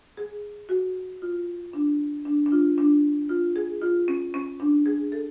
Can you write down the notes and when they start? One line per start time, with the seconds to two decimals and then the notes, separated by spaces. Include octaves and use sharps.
0.17 G#4
0.69 F#4
1.22 F4
1.73 D4
2.25 D4
2.46 D4
2.52 F4
2.78 D4
3.29 F4
3.56 G#4
3.82 F4
4.08 C#4
4.34 C#4
4.60 D4
4.86 G#4
5.12 A4